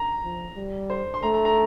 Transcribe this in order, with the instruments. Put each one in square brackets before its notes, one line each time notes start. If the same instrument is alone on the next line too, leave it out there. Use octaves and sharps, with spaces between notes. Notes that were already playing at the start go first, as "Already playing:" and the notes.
Already playing: [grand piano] A#5
[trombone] F3
G3
[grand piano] C5
C6
[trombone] A3 [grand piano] A#5
[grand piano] A#5
A#5